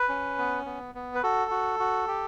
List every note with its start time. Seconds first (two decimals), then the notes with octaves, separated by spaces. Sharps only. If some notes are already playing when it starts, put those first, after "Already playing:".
Already playing: B4
0.09 C#4
0.38 B3
0.66 B3
0.95 B3
1.15 B4
1.23 F#4 A4
1.51 F#4
1.79 F#4
2.07 G4